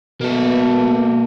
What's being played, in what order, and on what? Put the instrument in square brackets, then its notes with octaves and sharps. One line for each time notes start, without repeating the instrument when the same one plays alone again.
[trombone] B2 [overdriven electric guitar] A#3 A4